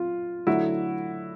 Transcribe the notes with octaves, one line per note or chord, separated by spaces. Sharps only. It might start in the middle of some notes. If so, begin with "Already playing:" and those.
Already playing: F#3 F4
D3 F#3 A3 E4 F#4